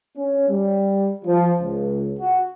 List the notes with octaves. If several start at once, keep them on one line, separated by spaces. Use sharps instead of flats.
C#4
G3
F3
C#2
F#4